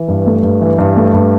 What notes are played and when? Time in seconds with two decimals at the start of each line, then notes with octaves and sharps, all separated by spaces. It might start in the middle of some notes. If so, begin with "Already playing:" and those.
Already playing: E3
0.08 G2
0.26 A3
0.43 G2
0.61 E3
0.78 G2
0.96 A3
1.13 G2